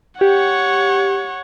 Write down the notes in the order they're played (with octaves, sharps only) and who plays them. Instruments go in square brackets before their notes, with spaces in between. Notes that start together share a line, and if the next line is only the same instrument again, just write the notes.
[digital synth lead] G4 [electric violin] C#5 F#5